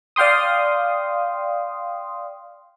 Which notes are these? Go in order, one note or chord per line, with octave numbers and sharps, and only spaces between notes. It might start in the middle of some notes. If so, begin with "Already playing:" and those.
D5 F5 G5 C6 D#6